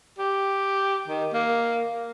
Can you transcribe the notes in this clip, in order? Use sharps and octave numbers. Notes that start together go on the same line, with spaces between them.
G4
D#3
A#3